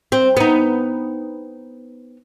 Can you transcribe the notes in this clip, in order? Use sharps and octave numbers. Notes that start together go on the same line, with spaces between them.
C4
B3 D#4